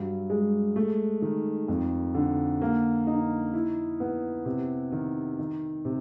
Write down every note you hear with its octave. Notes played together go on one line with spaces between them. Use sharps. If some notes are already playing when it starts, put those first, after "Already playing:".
Already playing: G2 F#3
G#3
A3
D#3
F2
D3
A#3
D#4
E4
B3
C3
D#3
D#3
C3